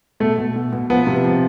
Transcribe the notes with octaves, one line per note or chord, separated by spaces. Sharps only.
B2 A3
B2
B2
B2
F3 B3
C3
F3